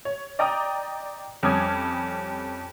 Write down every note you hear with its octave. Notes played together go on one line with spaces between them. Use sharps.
C#5
D5 D#5 G5 A#5 D6 D#6
F2 G3 C#4 D6 D#6 G#6